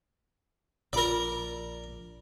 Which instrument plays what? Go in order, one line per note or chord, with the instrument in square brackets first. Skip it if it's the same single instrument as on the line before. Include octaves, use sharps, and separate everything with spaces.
[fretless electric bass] A#1 [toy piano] F4 E6 [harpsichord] A#4 D5